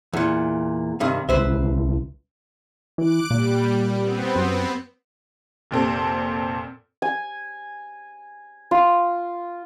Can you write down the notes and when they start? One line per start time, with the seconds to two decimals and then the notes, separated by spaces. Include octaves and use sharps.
0.13 E2 A#2
1.00 G2 C3 D#3
1.29 C2 C#3 B4 C5 E5
2.98 E3 D6 F#6 D7
3.31 A#2 G3
4.00 B3 C4
4.35 F#2
5.71 F1 A#2 C4 A4
7.02 G#5
8.71 F4